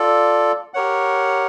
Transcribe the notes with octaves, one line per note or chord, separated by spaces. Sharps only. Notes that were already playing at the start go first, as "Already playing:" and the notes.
Already playing: F4 A4 D5
G4 A#4 C#5 F#5